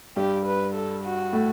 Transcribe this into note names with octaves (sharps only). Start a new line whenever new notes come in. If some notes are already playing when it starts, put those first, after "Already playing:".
G2 G3 G4
B4
A4
F#4
A2 A3